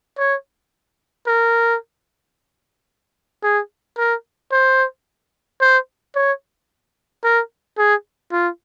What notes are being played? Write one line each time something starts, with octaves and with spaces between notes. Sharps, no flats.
C#5
A#4
G#4
A#4
C5
C5
C#5
A#4
G#4
F4